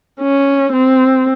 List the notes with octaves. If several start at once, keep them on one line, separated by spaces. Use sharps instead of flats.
C#4
C4